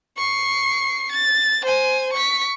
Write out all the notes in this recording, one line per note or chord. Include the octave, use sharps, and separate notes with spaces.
C#6 C7
A6
C5 G#5
C#6 B6